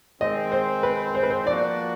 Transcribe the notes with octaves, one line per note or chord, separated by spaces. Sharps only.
D#3 G#3 C4 D#5
C5
B4
C5
B4
C5
F3 A#3 D4 F#4 D5